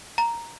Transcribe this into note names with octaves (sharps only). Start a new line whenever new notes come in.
A#5